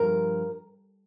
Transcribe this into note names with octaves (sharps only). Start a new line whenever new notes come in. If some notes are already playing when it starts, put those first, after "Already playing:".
Already playing: G2 F3 A#4